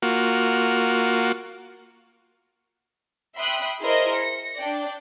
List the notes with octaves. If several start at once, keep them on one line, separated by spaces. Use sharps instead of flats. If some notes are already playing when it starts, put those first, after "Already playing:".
A#3 F4 F#4
E5 G5 B5 C6 D#6 F#6
E4 G#4 A#4 C5 D#5
A#6 C#7
D4 D5 G5